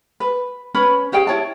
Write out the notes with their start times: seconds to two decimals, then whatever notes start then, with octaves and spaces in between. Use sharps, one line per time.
0.20 B4
0.75 C#4 B4 C#5 B5
1.12 C#4 G4 G#4 G5
1.27 E4 C#5 A5